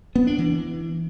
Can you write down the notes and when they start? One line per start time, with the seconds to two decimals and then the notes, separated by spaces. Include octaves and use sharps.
0.16 B3
0.27 D4
0.38 E3